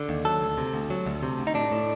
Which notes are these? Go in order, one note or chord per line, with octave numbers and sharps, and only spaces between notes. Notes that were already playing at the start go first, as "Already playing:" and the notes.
Already playing: D3
D#2
F#3 A4
D2
C3
D2
F#3
D2
C3
D2
D#4
A2 D4
A2